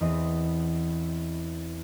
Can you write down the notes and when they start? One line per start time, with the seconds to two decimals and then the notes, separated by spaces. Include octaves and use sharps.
0.01 E2 B3 C4 D#5